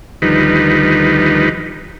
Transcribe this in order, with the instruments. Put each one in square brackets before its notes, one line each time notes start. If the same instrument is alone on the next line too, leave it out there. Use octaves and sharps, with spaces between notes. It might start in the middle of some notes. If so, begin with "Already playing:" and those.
[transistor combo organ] D2 D#3 F3 G3 D#4 B4